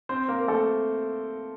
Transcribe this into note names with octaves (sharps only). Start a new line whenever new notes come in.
C4 C5
A#3 A#4
A#4
A3 A4